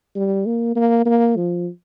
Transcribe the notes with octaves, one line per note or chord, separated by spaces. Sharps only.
G3
A#3
A#3
A#3
F3